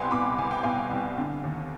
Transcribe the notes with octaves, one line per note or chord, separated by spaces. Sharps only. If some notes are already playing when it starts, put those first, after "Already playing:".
Already playing: C2 B2 G5 G#5 B5 C6
B2 B5 D6
C2 G#5
G5
B2 F5 G#5
C2
D3
D#2